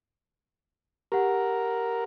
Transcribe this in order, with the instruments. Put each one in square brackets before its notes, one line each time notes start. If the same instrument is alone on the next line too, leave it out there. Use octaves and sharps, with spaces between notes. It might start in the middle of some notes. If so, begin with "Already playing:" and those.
[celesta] G4 F#5 [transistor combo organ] A#4